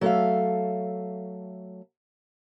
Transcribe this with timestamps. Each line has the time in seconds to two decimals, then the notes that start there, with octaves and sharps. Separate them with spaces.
0.01 F#3 A3 A4 C5 E5 F5